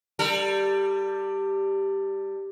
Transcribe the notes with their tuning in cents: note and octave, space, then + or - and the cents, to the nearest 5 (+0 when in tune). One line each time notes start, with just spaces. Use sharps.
G3 +0 A4 +35